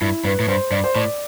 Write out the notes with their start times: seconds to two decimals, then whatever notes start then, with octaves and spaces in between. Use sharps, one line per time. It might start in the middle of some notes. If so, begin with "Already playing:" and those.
0.01 G2 E4
0.24 G2 B4
0.40 A2
0.48 G2 C5
0.71 G2 D5
0.84 C5
0.96 A2 D5